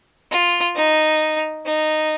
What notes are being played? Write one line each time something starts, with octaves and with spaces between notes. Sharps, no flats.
F4
D#4
D#4